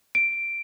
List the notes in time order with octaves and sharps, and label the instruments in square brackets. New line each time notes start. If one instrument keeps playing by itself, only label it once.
[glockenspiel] D7